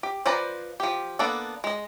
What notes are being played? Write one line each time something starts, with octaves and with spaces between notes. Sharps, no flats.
G4
F3 B4 C5 D5 A#5
F3 G4
A#3 B3 D4 A4
G#3 D#5